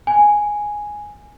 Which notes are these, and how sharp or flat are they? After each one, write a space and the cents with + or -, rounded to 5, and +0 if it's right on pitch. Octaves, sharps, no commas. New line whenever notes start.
G#5 +0